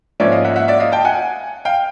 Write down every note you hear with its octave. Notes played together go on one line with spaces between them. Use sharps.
G#2 F3 A#3 C#4 D5 E5
D#5 F5
E5 F#5
E5 F#5
D5 E5
D#5 F5
G5 A5
F#5 G#5
F5 G5